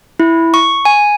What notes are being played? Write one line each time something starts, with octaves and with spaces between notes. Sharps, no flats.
E4
C#6
G#5